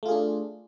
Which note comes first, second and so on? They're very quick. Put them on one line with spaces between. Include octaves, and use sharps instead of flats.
A3 F4 G#4 D4